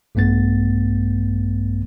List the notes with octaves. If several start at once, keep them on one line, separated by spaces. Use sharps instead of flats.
A#1 G2 A3 B3 A6